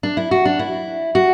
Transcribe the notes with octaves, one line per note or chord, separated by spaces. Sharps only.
D4
E4
F#4
D4
E4
F#4